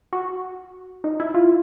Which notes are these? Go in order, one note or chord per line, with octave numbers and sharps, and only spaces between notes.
F#4
D#4
E4
F4